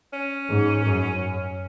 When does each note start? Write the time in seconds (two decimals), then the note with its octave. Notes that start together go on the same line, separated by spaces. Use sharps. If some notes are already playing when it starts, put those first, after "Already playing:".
0.13 C#4
0.48 G#2
0.86 F#2